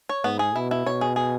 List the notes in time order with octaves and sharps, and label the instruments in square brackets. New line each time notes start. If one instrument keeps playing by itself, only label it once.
[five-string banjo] C#5
[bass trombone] G#2 [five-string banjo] B3
[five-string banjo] G#4
[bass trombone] B2 [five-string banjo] E4
[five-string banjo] E4
[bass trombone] B2 [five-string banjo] C#5
[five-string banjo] G#4
G#4